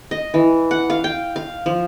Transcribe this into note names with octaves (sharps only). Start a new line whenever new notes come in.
D#5
E3
F#5
F5
G5
F5
F3